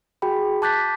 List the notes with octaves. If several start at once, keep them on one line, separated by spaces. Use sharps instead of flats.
F#4 G#4 G5 B5
A5 D6 F#6 G6 A6 B6